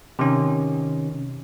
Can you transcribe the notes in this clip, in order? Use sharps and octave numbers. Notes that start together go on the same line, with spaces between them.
C3 D#3 C#4